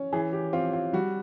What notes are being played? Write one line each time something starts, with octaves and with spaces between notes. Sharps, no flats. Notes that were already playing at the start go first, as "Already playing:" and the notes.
Already playing: C#4
E3 G#4
G4
C4 F4
F4
G3 F#4